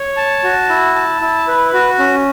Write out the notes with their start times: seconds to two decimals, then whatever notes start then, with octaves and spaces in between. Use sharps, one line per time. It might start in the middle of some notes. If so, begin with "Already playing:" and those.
Already playing: C#5
0.17 A5
0.44 F#4
0.69 E4
0.95 A5
1.21 E4
1.48 B4
1.73 F#4
1.99 C#4